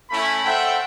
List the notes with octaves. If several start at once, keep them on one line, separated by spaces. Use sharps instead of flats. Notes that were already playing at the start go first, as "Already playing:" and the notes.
A3 C#4 E4 B5
A4 C5 E5 F#5 G5